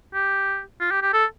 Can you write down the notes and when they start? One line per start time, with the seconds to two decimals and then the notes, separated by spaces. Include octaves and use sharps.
0.14 G4
0.80 F4
0.91 G4
1.02 G4
1.13 A4